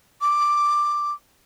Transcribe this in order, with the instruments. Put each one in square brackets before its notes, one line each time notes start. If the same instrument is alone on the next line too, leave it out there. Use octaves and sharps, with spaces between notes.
[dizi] D6